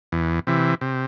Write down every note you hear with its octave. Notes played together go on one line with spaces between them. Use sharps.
E2
C3 E3
C3